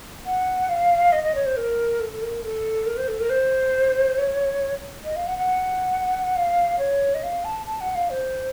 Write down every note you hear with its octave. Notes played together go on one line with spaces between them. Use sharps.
F#5
F5
D#5
D#5
C#5
C5
A#4
A4
A#4
A4
A#4
C5
A4
A#4
C5
C#5
D#5
F5
F#5
F#5
F5
C#5
D#5
F5
A5
A5
F#5
F5
C5